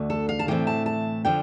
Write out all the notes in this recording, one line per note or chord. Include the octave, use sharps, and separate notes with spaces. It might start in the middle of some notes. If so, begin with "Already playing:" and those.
Already playing: D2 D3 A3
A4
F5
A5
A2 E3 A3 C4 G5
A5
A5
D3 F3 G5